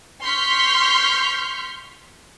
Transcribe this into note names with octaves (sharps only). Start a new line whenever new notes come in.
C6 C#6 F6 G6 B6